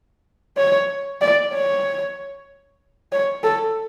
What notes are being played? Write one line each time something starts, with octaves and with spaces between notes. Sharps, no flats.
C#5
D5
C#5
C#5
A4